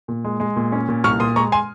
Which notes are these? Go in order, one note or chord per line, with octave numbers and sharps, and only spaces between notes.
A#2
G#3
G#3
A#2
C#4
A#2
C2 C#6 F6
A#2 C6 D#6
G#3 A#5 C#6
G#5 C6